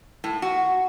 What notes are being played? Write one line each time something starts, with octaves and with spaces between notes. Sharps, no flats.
A2
F#4